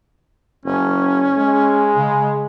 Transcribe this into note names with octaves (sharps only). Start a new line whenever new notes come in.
F#1 C#4
G#3
C#3